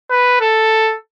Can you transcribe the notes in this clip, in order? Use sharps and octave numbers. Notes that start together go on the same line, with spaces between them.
B4
A4